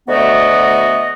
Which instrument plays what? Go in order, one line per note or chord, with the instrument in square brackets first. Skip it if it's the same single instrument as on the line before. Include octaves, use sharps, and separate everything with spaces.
[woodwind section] D2 A3 B3 F#4 D#5